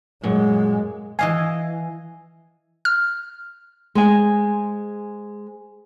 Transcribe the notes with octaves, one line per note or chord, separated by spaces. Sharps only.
F#2 A#2 G#3
E3 D#5 F5 G#5
F6
G#3 C5 G#5